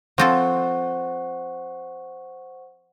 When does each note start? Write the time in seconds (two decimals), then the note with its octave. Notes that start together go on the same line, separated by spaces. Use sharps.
0.18 F3 C4 A4 C5 F#5 C#6